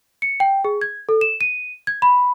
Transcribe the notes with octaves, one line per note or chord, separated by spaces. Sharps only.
C#7
G5
G#4
G#6
A4
E7
D#7
G#6
B5